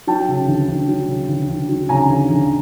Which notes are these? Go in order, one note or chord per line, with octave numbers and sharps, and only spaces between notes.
F#3 G5 A5
C#3
D2
D2
F#3
C#3
D2
D2
F#3
C#3 G#5 A#5
D2
D2